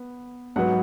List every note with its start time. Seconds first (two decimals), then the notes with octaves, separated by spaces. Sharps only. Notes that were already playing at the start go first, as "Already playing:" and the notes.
Already playing: B3
0.56 G#2 F#3 B3 F#5